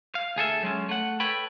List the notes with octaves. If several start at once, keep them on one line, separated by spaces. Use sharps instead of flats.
F5
D2 G#4 A4 E5
F#3 G#3 C#4
A3 F#5
A4 B4 C#5 G5 B5